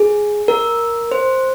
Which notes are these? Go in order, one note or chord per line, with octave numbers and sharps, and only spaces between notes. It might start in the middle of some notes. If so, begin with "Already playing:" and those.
Already playing: G#4
A#4
C5